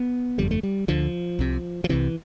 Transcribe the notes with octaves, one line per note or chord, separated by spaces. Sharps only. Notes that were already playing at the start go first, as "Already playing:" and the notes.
Already playing: B3
G1 F2 D3 G3
A3
G3
D2 D3 F3
C2 C3
F3
C2 C3 E3